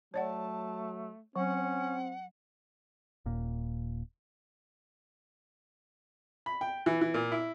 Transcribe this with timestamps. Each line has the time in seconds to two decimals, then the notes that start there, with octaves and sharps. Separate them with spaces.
0.14 F#3 A3 C#5 D5 F#5 A5
1.36 F#3 C4 C#4 F#5
3.26 D#1 A#2
6.46 B5
6.61 G5
6.86 E3
7.01 E3
7.14 A#2
7.32 E4